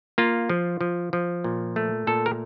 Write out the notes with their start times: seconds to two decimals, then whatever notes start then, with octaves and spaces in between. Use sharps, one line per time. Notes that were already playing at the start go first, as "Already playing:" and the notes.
0.18 A#3 F4
0.50 F3
0.81 F3
1.13 F3
1.44 A#2
1.76 A3
2.07 A#2 A4
2.26 A#4